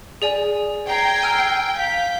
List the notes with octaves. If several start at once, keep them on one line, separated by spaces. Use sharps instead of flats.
G#4 D5 G#5
G5 A#5 G#6 C7
G#5 E6 F6
F5 G6 B6